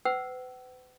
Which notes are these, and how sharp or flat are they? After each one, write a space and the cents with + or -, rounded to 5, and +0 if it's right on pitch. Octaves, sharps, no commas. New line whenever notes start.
B4 +40 F#5 +45 E6 +0